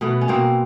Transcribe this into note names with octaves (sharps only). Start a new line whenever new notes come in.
B2 A3 B3
C#4
B2 A#3 C4